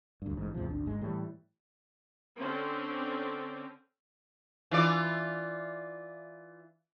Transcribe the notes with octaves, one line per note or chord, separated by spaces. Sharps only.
D2 G2
A1 G#2
E2 G#2 C3 F3
G#1 D2 D4
G#1 G#2 G#3
A2 E3 G3
D3 C4 C#4
E3 F4 D5